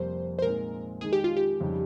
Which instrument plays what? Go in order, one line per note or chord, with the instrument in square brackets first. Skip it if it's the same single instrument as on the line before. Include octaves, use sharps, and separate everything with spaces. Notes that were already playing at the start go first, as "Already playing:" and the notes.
Already playing: [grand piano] F2 C3 G3 A#3 [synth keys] C5
[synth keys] C5
[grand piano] A#2 G#3 C4 D#4 [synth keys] A#4
[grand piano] D#3 G#3 D#4 [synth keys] G#4
[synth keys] G4
F4
G4
[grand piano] F2 C#3 G3 C4 D#4